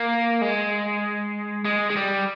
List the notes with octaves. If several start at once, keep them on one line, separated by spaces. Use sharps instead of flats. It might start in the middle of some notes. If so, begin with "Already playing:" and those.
Already playing: A#3
G#3
G#3
G#3
G3